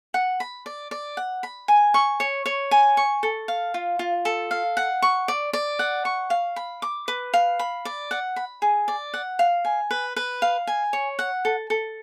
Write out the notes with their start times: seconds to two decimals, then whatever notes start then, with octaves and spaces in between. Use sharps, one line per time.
0.14 F#5
0.40 B5
0.66 D5
0.91 D5
1.17 F#5
1.43 B5
1.68 G#5
1.94 C#6
2.20 C#5
2.46 C#5
2.71 G#5
2.97 C#6
3.23 A4
3.48 F5
3.74 F4
3.99 F4
4.25 A4
4.51 F5
4.77 F#5
5.02 C#6
5.28 D5
5.53 D5
5.79 F#5
6.05 C#6
6.30 F5
6.56 B5
6.82 D6
7.08 B4
7.34 F5
7.59 B5
7.85 D5
8.11 F#5
8.36 B5
8.62 G#4
8.88 D5
9.14 F#5
9.39 F5
9.65 G#5
9.91 B4
10.16 B4
10.42 F5
10.67 G#5
10.93 C#5
11.19 F#5
11.45 A4
11.70 A4